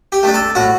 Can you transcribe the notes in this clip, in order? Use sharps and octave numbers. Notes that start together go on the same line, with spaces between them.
G4
A3 D4
A4
A2 F#4